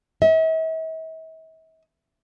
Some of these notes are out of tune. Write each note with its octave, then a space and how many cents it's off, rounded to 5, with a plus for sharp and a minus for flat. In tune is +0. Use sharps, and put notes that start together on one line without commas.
E5 -45